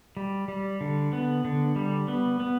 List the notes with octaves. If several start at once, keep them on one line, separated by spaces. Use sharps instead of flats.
G3
G3
D3
B3
D3
G3
B3
B3